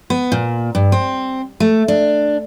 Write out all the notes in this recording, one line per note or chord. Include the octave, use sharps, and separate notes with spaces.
B3
A#2
G2
C4
A3
D4